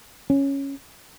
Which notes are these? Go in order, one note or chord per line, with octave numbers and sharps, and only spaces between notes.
C#4